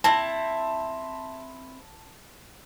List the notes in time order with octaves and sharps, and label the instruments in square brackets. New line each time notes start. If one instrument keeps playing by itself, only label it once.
[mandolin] C4 E4 [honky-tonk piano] A5